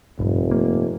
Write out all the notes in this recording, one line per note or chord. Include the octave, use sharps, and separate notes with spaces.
F1 A#1 G2
A#3